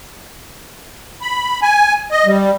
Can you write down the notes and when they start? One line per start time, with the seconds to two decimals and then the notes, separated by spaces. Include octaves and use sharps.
1.22 B5
1.62 G#5
2.12 D#5
2.26 G3